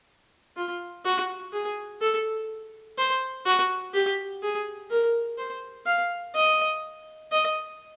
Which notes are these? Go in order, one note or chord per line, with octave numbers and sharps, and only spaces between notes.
F4
F#4
G#4
A4
C5
F#4
G4
G#4
A#4
C5
F5
D#5
D#5